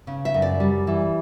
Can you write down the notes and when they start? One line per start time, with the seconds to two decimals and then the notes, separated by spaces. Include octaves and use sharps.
0.07 C#3
0.25 E5
0.34 F#2
0.42 D5
0.60 G3
0.87 E3